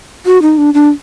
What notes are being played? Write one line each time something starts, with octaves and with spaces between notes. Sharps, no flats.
F#4
D#4
D4
D4